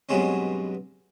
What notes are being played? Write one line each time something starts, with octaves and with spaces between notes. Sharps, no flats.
G2 B2 F#3 G#3 C4 C#4